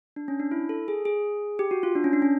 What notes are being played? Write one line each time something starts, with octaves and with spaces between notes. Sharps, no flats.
D4
C#4
D4
E4
A4
G#4
G#4
G4
F#4
F4
D4
C#4
D4
C#4